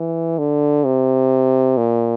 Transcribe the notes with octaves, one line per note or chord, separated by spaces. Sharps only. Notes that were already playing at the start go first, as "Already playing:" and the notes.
Already playing: E3
D3
C3
A#2